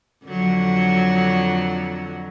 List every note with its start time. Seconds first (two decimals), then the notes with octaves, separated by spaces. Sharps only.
0.25 F2 D3 F#3